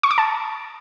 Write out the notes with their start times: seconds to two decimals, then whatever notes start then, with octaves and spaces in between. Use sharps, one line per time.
0.03 C#6
0.11 D6
0.18 A5